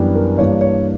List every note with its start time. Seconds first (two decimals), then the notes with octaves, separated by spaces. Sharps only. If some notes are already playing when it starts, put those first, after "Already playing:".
Already playing: F#2 E3 G3 B3 D4
0.15 A#4
0.38 G2 E3 A#3 D4 C#5
0.61 C#5